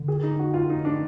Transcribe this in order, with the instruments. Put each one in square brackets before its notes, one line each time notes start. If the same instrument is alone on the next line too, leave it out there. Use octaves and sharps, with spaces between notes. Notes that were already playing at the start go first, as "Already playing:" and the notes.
Already playing: [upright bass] D3
[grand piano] G#4
D#4
F#4
F4
D#4
D4